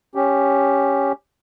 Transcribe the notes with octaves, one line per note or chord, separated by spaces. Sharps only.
C#4 G4